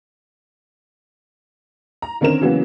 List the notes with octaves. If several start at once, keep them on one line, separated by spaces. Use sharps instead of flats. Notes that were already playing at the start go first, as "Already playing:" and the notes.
A#5
D3 D#3 C4 C#4 A#4 E7
C#3 E3 F#3 A#3 B3